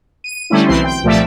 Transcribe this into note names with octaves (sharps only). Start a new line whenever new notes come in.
D#7
D3 G3 A3 C#4 E4
B1 E3 C4 E4 C6
G5
C2 A#2 F3 A3 D5 E5